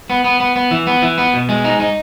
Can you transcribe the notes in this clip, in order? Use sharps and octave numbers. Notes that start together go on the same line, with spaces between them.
B3
B3
B3
B3
E3
B3
E3
B3
B2
G#3
D#4
D#4